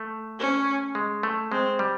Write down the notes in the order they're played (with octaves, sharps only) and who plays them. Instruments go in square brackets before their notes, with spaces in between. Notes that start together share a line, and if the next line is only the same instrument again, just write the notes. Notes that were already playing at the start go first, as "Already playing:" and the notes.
Already playing: [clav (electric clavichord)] A3
[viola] C#4
[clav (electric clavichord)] G#3
A3
[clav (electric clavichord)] G#3 [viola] C4
[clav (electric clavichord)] G3